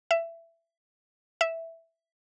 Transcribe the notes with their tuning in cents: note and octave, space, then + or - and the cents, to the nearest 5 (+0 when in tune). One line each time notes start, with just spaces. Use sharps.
E5 +20
E5 +0